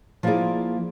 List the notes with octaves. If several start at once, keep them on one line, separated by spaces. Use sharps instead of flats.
F3 A#3 E4 F4 G#4 D5